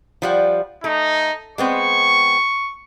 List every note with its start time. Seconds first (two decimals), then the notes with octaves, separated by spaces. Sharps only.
0.22 F3 G3 F#5
0.84 A3 D#4
1.58 G#3 B3 C4 C#6